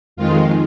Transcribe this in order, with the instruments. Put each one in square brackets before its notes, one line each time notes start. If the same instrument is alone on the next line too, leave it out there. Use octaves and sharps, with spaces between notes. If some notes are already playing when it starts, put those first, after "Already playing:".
[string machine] F2 D#3 G#3 F4